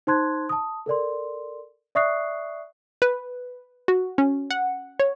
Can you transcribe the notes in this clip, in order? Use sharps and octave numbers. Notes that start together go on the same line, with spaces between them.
D#4 C5 A5 C6 F#6 G#6
A5 D#6
A4 A#4 D5 C6
D5 E5 C#6 D#6 F#6 C7
B4
F#4
C#4
F#5
C#5